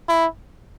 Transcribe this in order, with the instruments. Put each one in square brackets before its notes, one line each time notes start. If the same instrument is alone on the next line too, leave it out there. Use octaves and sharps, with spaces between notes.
[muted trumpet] E4